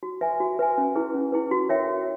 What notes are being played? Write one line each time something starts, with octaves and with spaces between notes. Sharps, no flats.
F#4
B4 E5 G#5
F#4
B4 E5 G#5
C#4
E4 G#4 B4
C#4
E4 G#4 B4
F#4
A#4 C#5 E5 G5
F#4